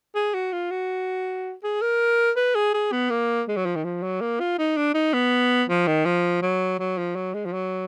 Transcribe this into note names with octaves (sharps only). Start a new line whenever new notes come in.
G#4
F#4
F4
F#4
G#4
A#4
B4
G#4
G#4
B3
A#3
G#3
F#3
F3
D#3
F3
F#3
A#3
F4
D#4
D4
D#4
B3
F3
D#3
F3
F#3
F#3
F3
F#3
G#3
F3
F#3